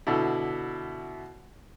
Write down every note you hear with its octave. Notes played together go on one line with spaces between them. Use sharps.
B2 D3 E4